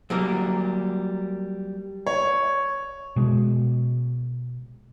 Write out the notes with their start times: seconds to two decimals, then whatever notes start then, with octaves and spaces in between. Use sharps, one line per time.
0.10 F#3 G3 A#3
2.06 C#5
3.16 B2 G#3